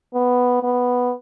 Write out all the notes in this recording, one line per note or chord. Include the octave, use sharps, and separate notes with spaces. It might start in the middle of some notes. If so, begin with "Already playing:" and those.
B3
B3